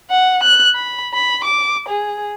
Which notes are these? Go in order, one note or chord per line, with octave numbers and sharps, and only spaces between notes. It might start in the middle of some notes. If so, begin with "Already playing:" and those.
F#5
F#6
B5
B5
D6
G#4